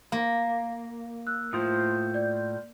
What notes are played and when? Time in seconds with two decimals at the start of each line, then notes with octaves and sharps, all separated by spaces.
0.12 A#3
1.27 E6 F#6
1.53 A2 F4 C5 D#6
2.14 D5 G6